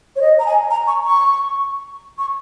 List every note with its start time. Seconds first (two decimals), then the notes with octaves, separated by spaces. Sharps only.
0.16 C#5
0.21 D#5
0.39 A#5
0.46 G#5
0.70 A#5
0.87 C#6
1.04 C#6
2.18 C#6